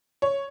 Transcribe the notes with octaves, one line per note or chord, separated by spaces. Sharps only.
C#5